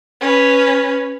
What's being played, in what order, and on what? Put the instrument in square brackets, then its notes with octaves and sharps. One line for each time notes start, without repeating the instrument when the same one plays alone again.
[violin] C#4 B4